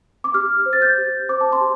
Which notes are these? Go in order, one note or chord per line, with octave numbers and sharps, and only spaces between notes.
D6
G4 F6
C5
A6
G6
G4
C5 D6
A5
C6
G4